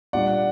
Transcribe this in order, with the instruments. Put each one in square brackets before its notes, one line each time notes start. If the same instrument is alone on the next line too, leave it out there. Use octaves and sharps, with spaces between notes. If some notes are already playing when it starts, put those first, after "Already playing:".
[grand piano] A#2 G3 D4 D5 F#5